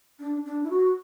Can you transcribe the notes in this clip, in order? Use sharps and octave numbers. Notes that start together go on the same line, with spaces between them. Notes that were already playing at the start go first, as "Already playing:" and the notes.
D4
D4
E4
F#4